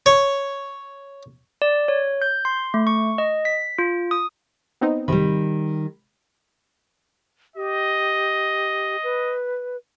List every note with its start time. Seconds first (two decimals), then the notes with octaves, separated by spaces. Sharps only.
0.06 C#5
1.62 D5
1.88 C#5
2.22 G6
2.45 C6
2.74 A3
2.87 C#6
3.18 D#5
3.45 B6
3.79 F4
4.11 D#6
4.81 B3 C4 D#4
5.08 G#1 C3 D#3 G3 B5
7.56 G4 D#5
9.03 B4